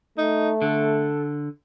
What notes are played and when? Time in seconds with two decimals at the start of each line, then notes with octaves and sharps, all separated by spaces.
0.18 A3 D#4
0.62 D3 A4